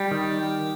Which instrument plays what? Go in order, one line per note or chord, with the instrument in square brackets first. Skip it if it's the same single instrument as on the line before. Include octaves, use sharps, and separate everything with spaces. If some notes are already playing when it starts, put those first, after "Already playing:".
Already playing: [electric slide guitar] G3 [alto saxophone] G4
[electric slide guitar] D#3